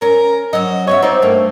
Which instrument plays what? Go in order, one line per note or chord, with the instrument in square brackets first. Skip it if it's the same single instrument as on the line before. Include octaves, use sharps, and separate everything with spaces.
[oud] C#4 [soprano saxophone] A#4
[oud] F#3 C#4 [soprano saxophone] D#5
[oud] B3 F#4 E5 [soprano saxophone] C#5
[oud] C4 D5 [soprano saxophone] D#4
[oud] G2 A#3 [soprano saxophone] A3